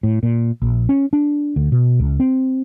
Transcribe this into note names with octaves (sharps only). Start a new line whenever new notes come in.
A2
A#2
A#1
C#4
D4
D2
B2
C#2
C4